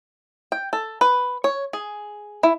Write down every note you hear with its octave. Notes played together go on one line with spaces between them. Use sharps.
G5
A4
B4
C#5
G#4
E4